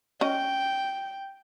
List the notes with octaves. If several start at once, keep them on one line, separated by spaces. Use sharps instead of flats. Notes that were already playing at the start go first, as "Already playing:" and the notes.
C#4 D#5 G5